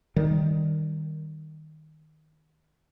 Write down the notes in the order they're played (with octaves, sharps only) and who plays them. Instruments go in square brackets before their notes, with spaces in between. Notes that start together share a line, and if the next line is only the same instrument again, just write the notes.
[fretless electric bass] D#3 G3